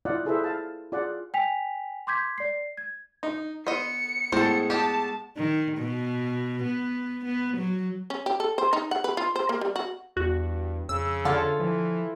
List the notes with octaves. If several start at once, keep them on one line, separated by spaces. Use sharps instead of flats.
E4 F4 D5 D#5 F5 F#5
E4 G#4 A4 B4 C5 E5
F5 A5
F4 G#4 D5 F#5
G5 G#5 B6 F7
C6 D6 G6 G#6 B6
D5 C7
G#6
D#4
B3 C5 D#5 C#7
A2 G#3 B3 G#4 C5 A5
G4 D#5 F#5 A5
D#3
B2
B3
B3
F#3
C#4
G4
A4
C5
D#4
F#5
B4
F4
C5
A#3
G3
F#4
E2 G2 F#4
F2 C#3 E6
D3 F4 A4 C#5
E3 F3